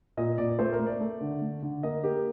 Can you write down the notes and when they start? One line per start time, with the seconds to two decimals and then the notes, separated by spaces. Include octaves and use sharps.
0.17 A#2 D#5
0.38 A#2 D5
0.59 A3 C5
0.73 A#4
0.79 A3
0.87 D5
1.00 A3
1.21 D3
1.42 A3
1.63 D3
1.83 A#3 D#5
2.04 A#3 G4